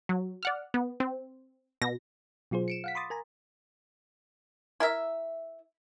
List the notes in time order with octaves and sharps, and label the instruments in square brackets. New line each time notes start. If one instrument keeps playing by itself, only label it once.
[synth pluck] F#3
D5 F#5 F6
B3
C4
B2 A#6
B2 F#3 F4 G#4 C5
C#7 D7 E7
F5 F#5 B6
B5 C6 D6 D#6 A6
A#4 G#5 A#5
[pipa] E4 A#4 E5